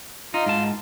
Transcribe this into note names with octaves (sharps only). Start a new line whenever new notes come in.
D#4 F4 C6
G#2 A5